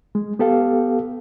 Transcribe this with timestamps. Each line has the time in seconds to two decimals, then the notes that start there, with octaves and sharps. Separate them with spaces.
0.15 G#3
0.39 B3 G4 A4 F5